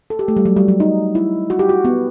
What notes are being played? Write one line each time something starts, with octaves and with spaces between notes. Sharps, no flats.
A4
G4
A3
G3
F#3
G3
F#3
D#4
E4
F#4
G4
F#4
B3